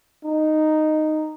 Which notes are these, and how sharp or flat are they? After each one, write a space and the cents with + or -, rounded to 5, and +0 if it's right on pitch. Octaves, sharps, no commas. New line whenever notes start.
D#4 -5